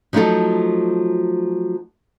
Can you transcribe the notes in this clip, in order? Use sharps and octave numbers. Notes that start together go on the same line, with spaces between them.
F3 F#3 A3 D#4 A4